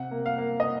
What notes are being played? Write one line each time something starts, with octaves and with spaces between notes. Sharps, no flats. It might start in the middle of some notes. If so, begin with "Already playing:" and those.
Already playing: C3 F#5
A#3
F5
A#3
D#5